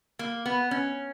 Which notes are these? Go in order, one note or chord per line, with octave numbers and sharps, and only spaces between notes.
A#3
B3
C#4